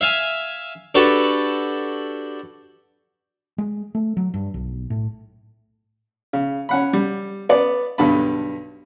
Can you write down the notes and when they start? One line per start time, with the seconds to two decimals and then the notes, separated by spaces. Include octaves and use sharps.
0.01 E5 F5 G#5
0.95 D4 F#4 G4 A4 B4
3.58 G#3
3.95 A3
4.17 F#3
4.34 G2
4.54 B1
4.90 A2
6.33 C#3
6.69 C#4 F#5 B5
6.93 G3
7.49 B3 D5
7.98 B1 G2 D3 A5 B5